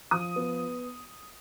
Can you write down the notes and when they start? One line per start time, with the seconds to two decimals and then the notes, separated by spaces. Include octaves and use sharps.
0.11 F3 D#6
0.36 B3